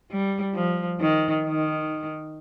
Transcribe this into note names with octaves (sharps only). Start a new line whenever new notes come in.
G3
F3
D#3
D#3